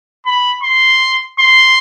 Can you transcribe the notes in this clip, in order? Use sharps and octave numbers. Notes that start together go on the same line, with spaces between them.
B5
C6
C6